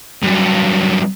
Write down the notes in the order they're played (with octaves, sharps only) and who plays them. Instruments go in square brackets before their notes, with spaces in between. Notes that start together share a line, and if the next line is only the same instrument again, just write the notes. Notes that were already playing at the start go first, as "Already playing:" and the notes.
[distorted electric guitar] G2 F#3